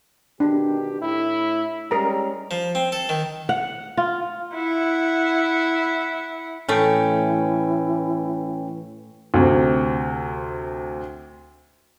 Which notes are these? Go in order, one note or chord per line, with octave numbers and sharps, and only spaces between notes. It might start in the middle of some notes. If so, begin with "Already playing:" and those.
B2 D#3 D4 G4
A2 E4
G3 G#3 C#4 A#4 A#5
F3
C4
A4
D#3
F#5
F4
E4 F#5
A2 E3 A3 C#4 G5
D2 C3